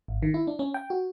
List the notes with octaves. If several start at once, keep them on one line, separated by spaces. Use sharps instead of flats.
G#1
D#3
E4
D4
C#4
G5
F#4